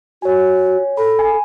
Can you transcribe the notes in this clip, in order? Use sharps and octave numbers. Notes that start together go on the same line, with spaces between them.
F#4 C#5 G#5
A4 B5
G#5